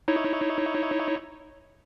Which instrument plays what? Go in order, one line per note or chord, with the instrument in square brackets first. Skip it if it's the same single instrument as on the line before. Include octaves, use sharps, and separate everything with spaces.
[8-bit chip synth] D#4 E4 C#5